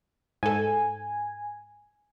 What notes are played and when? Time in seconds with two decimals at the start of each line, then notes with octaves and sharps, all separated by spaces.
0.43 G#2 A4 G#5